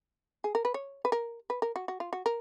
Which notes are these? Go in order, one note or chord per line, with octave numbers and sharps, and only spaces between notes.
G#4
A#4
B4
C#5
B4
A#4
B4
A#4
F#4
F#4
F4
F#4
A#4